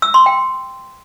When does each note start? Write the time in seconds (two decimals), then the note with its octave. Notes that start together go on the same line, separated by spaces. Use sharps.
0.02 E6
0.14 C6
0.26 G5